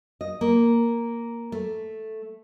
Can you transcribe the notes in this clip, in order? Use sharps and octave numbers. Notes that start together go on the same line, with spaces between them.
D#5
A#3
A3